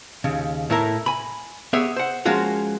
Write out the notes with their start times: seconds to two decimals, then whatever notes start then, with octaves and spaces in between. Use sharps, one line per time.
0.24 D#2 C#3
0.70 A2 E4 A#4
1.06 G#5 B5
1.73 B3 G4 G#4 C#5 E5
1.96 C5 F#5
2.25 F3 G#3 A#3 C#4 F4 F#4